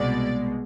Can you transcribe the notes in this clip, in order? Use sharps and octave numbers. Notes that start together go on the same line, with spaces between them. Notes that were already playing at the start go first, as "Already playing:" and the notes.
Already playing: C2 B2 G#3 D5